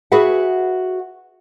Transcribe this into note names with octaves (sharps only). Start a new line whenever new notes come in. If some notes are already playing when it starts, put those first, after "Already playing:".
F#4 G#4 B4 E5 F#5